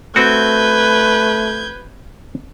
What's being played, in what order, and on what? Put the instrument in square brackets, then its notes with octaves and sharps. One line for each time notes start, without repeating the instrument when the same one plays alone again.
[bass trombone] A3 [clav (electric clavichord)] C4 F#4 [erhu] B4 [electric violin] G6 G#6